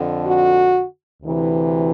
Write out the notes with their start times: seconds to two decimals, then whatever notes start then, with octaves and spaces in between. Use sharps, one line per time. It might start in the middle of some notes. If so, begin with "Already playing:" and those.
Already playing: F2 D3
0.27 F#4
1.22 D2 C3 E3